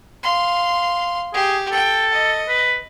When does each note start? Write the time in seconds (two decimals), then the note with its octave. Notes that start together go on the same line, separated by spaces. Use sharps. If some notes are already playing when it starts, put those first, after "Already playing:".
0.23 F5 C6
1.34 G4 G#4
1.72 A4 G5
2.12 D#5
2.48 B4